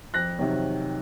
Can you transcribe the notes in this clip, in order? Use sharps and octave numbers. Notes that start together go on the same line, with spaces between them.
F2 F#6 A#6
C3 D#3 F#3